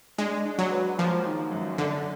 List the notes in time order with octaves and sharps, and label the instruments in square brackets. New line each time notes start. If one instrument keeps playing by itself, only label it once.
[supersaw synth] G#3 [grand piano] D4
[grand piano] D4
[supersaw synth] F#3
[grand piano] B4
[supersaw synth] F3 [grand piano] A#3
[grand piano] D#3
F#2
[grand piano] F#2 [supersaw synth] D3